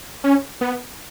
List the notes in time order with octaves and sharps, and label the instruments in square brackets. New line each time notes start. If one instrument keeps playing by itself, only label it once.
[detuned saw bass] C#4
B3